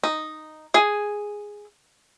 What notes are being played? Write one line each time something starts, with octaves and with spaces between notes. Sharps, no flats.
D#4
G#4 G#5